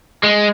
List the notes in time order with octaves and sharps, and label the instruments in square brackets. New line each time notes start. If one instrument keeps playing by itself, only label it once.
[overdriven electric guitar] G#3